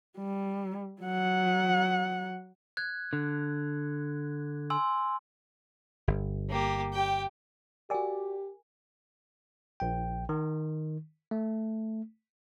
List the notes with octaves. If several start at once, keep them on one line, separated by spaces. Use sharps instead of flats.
G3
F#3 F#5
F#6 G#6
D3
G#5 C6 E6
G1
A#3 G4
G4 G5
F#4 G4 A#4 D5 G#5
A#1 G5
D#3
A3